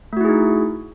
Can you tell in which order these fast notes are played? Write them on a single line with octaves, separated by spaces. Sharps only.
A3 F#4 E4 G#4 D#4